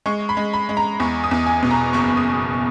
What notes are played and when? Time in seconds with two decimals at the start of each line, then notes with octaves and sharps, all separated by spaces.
0.06 G#3 C#6
0.29 B5
0.37 G#3
0.53 B5
0.69 G#3
0.77 A#5
1.00 E2 C#6
1.24 D#6
1.31 E2
1.46 G#5
1.63 B2
1.71 A#5
1.93 F#1 C#6
2.17 D#6